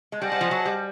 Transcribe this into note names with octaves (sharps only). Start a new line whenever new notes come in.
G#3
G3 G#4 C5 D#5 F#5 A5
G3
F3
F#3
G3